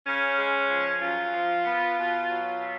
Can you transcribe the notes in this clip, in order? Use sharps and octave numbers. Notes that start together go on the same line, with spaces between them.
C#3 C#4
G#3
F3
F#2 F4
F3
B3
B2
F#3
B2